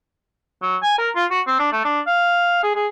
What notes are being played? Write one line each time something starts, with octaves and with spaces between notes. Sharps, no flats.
F#3
G#5
A#4
F4
F#4
C4
D4
A3
D4
F5
G#4
G#4